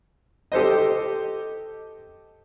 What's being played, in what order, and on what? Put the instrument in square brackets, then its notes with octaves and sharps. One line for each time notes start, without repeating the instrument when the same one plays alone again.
[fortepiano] G4 A4 C5 D#5